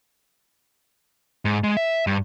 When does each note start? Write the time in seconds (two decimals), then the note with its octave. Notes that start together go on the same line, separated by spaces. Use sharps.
1.45 G#2
1.64 G#3
1.77 E5
2.07 G2